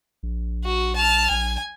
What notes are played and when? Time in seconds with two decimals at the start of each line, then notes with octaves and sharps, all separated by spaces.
0.23 A#1
0.65 F#4
0.96 A5 F6
1.30 A#1 G#5